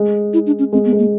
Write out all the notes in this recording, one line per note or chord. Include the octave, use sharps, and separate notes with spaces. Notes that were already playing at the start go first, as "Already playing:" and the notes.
Already playing: G#3
E4
D4
C#4
G#3 C4
B3
G#3
A#3